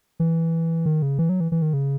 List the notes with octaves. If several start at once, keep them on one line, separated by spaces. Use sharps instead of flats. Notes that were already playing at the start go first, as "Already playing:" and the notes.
E3
D#3
C#3
E3
F#3
E3
E3
D#3
C#3